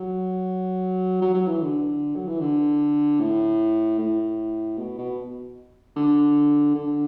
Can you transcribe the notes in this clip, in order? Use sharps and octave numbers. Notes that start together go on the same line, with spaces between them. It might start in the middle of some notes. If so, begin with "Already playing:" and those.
Already playing: F#3
F#3
F#3
E3
D3
F#3
E3
D3
A2
A2
B2
B2
D3
D3